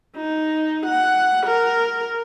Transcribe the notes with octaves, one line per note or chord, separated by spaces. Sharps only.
D#4
F#5
A#4